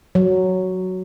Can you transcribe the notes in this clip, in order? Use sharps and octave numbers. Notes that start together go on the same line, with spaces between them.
F#3